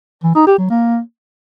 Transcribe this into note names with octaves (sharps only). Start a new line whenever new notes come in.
E3
D#4
G4
F#3
A#3